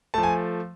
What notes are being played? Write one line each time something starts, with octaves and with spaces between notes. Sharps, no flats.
F3 A3 A5
G#5